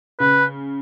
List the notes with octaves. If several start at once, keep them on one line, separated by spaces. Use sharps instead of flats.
C#3 B4